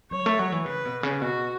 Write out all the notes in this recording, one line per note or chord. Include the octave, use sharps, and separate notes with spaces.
F#3 C#5
A3
F#3
E3
C#3 B4
B2
C#3
B2 F#4